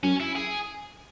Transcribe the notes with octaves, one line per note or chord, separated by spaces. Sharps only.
F#2 C#4
E4
G#4